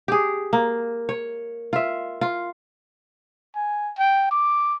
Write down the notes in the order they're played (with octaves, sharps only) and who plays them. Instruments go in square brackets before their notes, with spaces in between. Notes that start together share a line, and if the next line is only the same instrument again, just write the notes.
[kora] G4 G#4
A#3
C#5
F4 E5
F4
[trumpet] G#5
G5
D6